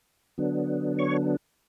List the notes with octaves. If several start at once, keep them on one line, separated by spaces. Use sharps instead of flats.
D3 F#3 B3 D4
C#5 C#6